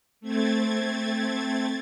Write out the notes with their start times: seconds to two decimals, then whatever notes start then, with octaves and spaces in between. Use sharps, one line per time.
0.21 A3 C4 G#6 A6